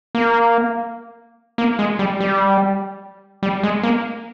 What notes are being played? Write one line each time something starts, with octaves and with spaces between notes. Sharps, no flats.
A#3
A#3
G#3
G3
G3
G3
G#3
A#3